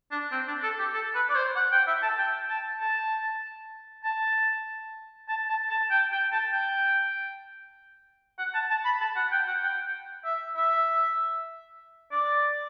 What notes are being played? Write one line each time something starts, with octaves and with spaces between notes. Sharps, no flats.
D4
C4
D4
A4
G4
A4
B4
D5
C5
F#5
G5
E5
A5
G5
A5
A5
A5
A5
A5
A5
G5
G5
A5
G5
F#5
A5
A5
B5
A5
F#5
G5
F#5
G5
E5
E5
D5